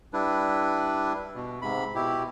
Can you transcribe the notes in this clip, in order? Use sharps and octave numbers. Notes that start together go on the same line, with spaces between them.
G3 D4 E4 B4
B2
G#2 C3 B5
B2 E4 G4